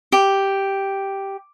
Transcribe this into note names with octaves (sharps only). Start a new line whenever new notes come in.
G4